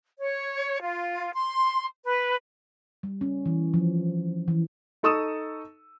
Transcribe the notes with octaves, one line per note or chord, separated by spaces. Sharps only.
C#5
F4
C6
B4
G3
C#4
E3
F3
E3
D#4 A4 C#6 D#6 E6 E7